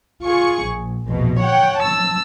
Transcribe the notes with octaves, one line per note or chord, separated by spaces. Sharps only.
F4 G#4 C#6
A#1
A#1 E2 B2
C#5 F#5 G5
A5 E6